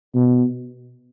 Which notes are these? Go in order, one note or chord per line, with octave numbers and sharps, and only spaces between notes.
B2